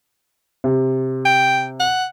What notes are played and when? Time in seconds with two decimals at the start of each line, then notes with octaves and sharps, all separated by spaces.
0.64 C3
1.25 G5
1.80 F#5